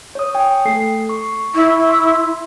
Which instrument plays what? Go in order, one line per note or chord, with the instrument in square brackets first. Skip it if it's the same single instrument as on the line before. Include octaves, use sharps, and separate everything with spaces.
[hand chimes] C#5 D#6
G5 G#5 D#6
A3 A4 C7
C#6
[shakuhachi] E4 [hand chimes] C#6
[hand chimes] C6 E6